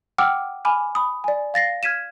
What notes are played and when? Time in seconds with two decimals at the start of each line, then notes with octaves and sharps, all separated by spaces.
0.18 F#5 G5 D6 E6 F6
0.65 G#5 B5 D6 F6
0.95 B5 D#6
1.24 D5 G#5
1.54 F5 A6 A#6 C7
1.83 F6 G#6 B6 D#7 E7